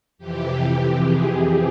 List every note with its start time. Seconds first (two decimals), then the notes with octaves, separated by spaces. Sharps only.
0.18 F2 C3 E3 G4
1.00 G#4